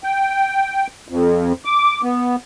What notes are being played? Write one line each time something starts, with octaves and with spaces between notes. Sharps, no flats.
G5
F2
D6
B3